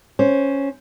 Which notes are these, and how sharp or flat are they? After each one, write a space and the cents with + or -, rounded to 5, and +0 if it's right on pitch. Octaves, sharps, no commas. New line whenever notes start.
C#4 +0 C5 +0